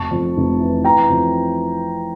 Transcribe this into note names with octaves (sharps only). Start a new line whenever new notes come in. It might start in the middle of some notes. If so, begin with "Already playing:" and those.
Already playing: F1 A5 C#6
F2
F1
E3
E3 G5 A#5
F2